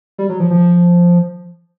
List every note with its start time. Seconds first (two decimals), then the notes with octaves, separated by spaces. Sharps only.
0.18 G3
0.29 F#3
0.40 F3
0.51 F3